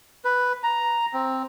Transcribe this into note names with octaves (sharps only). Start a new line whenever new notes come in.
B4
A#5
C4